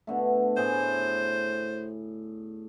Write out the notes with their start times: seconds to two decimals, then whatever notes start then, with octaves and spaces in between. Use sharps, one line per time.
0.07 B2 D3 A3
0.57 A2 G#4 C5